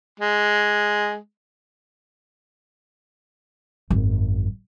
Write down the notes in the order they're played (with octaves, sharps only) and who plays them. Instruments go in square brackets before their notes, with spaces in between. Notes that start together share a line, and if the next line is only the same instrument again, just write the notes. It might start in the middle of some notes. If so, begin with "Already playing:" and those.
[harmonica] G#3
[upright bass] G#1 F#2